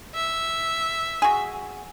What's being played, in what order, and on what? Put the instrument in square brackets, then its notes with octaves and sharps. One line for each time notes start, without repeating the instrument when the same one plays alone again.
[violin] E5
[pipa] F#4 G#4